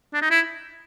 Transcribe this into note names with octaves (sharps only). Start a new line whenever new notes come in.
D4
D#4
E4